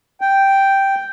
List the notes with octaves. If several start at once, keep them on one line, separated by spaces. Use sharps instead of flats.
G5